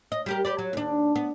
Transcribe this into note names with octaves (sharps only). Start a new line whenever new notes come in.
D#5
G3 G4 A#4
G4 B4 D5
F#3
D#2 D4
B3